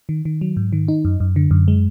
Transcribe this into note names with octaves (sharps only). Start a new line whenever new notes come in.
D#3
D#3
F#3
G#2
D#3
D#4
F#2
F#2
D3
F#2
G#3